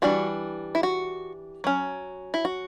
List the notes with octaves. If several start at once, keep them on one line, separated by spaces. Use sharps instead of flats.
E3 G3 D4 F#4
E4
F#4
F#3 C#4
E4
F#4